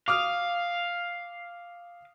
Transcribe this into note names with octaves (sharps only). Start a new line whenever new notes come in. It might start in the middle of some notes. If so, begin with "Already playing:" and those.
F5 D6 D#6 F6